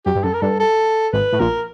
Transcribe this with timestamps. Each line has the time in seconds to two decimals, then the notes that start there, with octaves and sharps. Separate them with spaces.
0.06 F#2 G4
0.15 G2
0.24 F#2 A4
0.34 A#4
0.41 G2 A4
0.59 A4
1.13 G#1 G#2 B4
1.33 A2
1.40 A#1 A#2 A#4